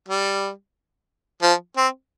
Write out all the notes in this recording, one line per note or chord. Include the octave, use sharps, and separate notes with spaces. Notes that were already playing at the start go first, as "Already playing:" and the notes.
G3
F3
C4